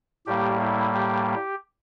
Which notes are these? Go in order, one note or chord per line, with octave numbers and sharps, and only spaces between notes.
A2 G3 A#3 G4
E4
G4